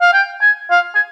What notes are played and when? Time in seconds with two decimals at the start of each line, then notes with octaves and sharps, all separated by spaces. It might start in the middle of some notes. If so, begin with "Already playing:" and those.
0.01 F5
0.13 G5
0.42 G#5
0.71 F5
0.95 G#5